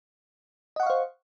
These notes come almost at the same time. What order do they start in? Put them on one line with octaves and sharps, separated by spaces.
D#5 F#5 C#6 F5 C5